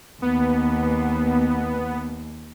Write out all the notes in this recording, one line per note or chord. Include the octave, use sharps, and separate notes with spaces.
D#2 B3